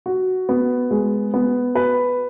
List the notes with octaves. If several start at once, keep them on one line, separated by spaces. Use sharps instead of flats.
F#4
B3
G#3
B3
B4